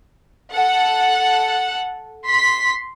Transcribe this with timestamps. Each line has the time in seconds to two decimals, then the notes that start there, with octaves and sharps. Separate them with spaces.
0.52 A4 F#5
2.26 C6 B6